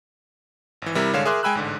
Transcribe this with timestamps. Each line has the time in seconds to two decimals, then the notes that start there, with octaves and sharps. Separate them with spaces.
0.82 G#1 E3
0.95 C3 G3 E4 A#4
1.13 G#1 D3 G#3 C#5 F5 E7
1.25 G#4 A#4 E5 C6 D6 F#6
1.43 G#3 G5 G#5 B5 E6 F#6
1.55 A1 G#2 D3